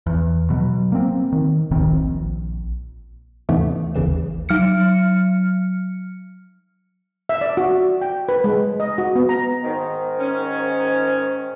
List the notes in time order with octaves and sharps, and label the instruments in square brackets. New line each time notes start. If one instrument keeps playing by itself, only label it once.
[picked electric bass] E2
B2 F#3
A#3 C4
D#3
D1 A1 D#3 C4
A#1
[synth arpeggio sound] D#2 G#2 C3 E3 A3 B3
G#1 D#2 C#3 E3 E7
[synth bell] F#3 F6 C#7
[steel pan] E5
D5
F#4
G5
B4
G#3
D#5
F#4
B3
A#5
[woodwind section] G#2 D#3
[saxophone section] C#4